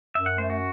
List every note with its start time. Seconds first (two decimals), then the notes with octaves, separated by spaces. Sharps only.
0.15 F#2 E5
0.26 F#5
0.38 A3 C5
0.50 F#4